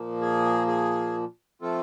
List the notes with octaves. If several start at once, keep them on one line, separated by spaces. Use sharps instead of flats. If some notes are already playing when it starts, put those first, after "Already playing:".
Already playing: A#2 F3 A#3
G#4
G#4
F3 A3 C4 F4 A4